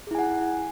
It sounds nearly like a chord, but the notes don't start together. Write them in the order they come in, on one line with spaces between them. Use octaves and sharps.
G#4 E4 G#5 F#5